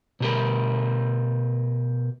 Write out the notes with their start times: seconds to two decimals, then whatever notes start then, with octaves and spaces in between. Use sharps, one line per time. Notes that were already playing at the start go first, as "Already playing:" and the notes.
0.20 B2 G4 A#4